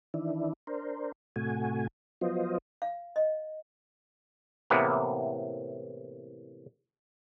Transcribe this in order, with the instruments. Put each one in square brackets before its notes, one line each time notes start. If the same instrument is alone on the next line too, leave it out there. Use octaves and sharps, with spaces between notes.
[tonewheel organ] D#3 E3 D4 E4
D4 A#4 C5
A2 C3 A3 F#4 G#5
F3 F#3 B3 F4 C5 D#5
[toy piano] F5
D#5
[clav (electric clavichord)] A2 C3 E3 A#3 B3